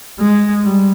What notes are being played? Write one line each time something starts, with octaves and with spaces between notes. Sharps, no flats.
G#3
G3